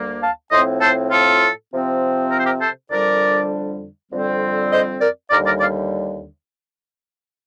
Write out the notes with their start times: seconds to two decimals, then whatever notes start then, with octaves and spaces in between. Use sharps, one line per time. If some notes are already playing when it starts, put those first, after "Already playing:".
Already playing: D2 D3 G3 A#3
0.20 F5 A5
0.51 A2 F3 C4 C5 D#5
0.80 A4 C5
1.11 F4 A4
1.71 C3 F3 C4
2.31 A#4
2.39 C5
2.46 G4 A#4
2.60 A4 C5
2.90 F2 D3 G3 D4 A#4 D5
4.11 F2 D3 G3 C4
4.71 C5 D#5
5.00 A#4 D5
5.30 D#2 D3 G3 A#4 D5
5.45 A#4 D5
5.60 D5 F5